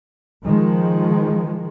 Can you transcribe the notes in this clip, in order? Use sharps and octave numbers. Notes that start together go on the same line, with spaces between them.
D#3 F3 G#3